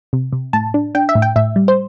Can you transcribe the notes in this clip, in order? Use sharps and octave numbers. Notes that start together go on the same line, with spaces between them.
C3
C3
A2 A5
D4
D4 G5
E5
A2
G5
A2 E5
G3
C5